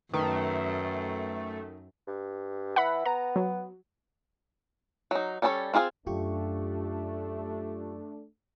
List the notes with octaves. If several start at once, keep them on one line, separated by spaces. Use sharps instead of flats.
F#2 D#3 A3 B4 A#5
G2
E3 F#5 B5
B3 A#5
F#3
F#3 D#4
G3 C#4 D4 A4 C#5
C4 F4 G#4 A#4 F5
F#2 A3 D4 F4 G4 C#6